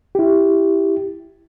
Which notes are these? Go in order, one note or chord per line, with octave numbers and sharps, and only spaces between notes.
E4 G4